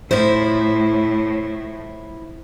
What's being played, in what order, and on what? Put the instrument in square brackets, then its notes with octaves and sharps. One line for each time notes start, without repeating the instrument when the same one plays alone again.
[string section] A2 [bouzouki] F3 C5 [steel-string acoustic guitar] E4